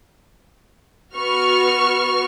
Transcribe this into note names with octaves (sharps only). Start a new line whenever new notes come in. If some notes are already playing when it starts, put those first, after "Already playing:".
B3 F#4 C#6 F6